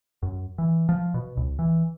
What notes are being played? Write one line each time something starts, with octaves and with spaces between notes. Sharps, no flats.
F#2
E3
F3
B2
C#2
E3